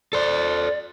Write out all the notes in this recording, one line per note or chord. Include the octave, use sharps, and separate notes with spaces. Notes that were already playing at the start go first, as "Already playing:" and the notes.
A4 C5 D5